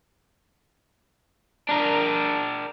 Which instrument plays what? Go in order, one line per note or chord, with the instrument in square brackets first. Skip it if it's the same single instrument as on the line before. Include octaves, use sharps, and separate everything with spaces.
[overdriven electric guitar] D4 A#4